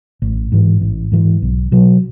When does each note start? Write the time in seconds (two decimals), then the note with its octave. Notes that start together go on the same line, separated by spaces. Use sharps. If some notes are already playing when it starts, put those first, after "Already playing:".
0.22 A1
0.52 G#2 E3
0.81 A1
1.12 G#2 E3
1.42 B1
1.72 B2 F#3